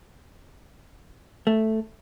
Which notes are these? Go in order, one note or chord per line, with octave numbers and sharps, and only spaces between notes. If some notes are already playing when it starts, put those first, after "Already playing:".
A3